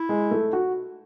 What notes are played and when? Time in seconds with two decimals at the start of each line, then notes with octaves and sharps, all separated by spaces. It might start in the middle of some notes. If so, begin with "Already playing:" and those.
Already playing: E4
0.09 G#3
0.31 A3
0.53 F#4